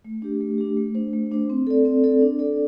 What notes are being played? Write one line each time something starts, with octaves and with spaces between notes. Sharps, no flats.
A3
D4 G4
A3
D4 G4
A3
D4 C5
A3
D4 C5
C4
A4 D5
C4
A4 D5
D4
A4 D5